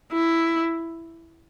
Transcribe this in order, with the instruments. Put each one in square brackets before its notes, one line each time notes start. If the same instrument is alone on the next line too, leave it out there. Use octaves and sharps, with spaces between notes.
[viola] E4